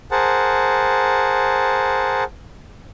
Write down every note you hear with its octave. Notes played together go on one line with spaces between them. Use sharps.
G#4 A#4 C5 F#5 A5